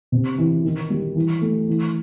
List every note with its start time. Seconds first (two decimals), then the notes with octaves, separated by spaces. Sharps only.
0.12 C3
0.38 E3
0.64 D#3
0.90 G3
1.16 E3
1.41 A3
1.68 E3